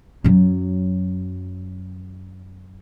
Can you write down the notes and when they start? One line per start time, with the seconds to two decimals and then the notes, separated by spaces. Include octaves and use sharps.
0.24 F#2 F#3